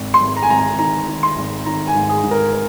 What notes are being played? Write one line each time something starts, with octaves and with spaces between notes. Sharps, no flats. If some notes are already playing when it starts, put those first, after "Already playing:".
Already playing: G#1
C6
G#1
A#5
G#5
G#1 A#5
G#5
D#3 A#5
D#3
C6
G#1
D#3 A#5
G#5
G#2
G#4
G#2
A#4
A#4